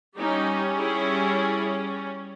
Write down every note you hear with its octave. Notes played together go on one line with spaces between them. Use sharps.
G3 C#4 D#4 G4
E4 G#4